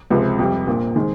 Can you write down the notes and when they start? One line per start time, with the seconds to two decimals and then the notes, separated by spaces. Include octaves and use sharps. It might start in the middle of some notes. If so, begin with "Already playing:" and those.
0.10 C#2 C3 F3 G#3
0.39 F2 C3 G3
0.67 A#1 A#2 F3 A#3
0.96 D#3 G#3 C4